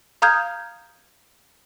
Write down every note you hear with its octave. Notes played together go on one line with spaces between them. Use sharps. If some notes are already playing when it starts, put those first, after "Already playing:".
F5 A#5 D#6 F6 G6 G#6